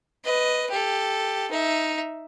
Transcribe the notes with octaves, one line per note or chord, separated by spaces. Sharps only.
B4 D#5
G4 A4
D#4 E5